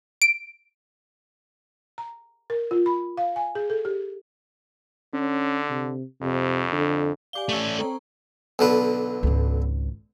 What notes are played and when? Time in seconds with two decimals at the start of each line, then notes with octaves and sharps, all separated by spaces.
0.22 D7
1.98 A#5
2.50 A#4
2.71 F4
2.86 B5
3.17 F5
3.36 G#5
3.55 G#4
3.70 A4
3.85 G4
5.14 D3 C#4
5.70 C3
6.22 F2 C3
6.73 D3
7.33 G4 D5 F5 G#5 D6 G7
7.49 A3 C#4 D5 A5 C#6 E6
7.79 C4 A4 C5 G5 A#5 C#6
8.59 B1 D3 B4
9.23 G#1 C#2